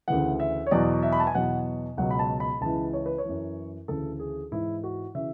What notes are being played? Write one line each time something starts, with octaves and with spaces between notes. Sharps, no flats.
D2 C#3 E3 F#5
E5
C#5
E2 B2 F#3 D5
E5
B5
A5
G#5
E2 B2 F#3 F#5
C#2 B2 F#3 F#5
B5
A5
B5
C#2 C#3 E3 A5
C#5
B4
C#5
F#2 E3
D2 C#3 E3 A4
G#4
G#2 E3 E4
F#4
C#3 E3 E5